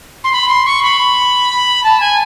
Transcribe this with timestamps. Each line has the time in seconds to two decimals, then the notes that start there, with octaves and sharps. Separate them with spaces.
0.24 C6
0.33 B5
0.48 C6
0.66 C#6
0.83 B5
1.84 A5
2.00 G#5